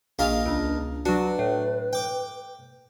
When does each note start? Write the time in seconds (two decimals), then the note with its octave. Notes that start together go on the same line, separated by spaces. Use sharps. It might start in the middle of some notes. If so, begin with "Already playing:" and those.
0.19 A#1 A#3 F4 D#5 F5
0.46 C#2 D4
1.06 F#3 D4 F#4 B4
1.39 A2
1.93 G5 D6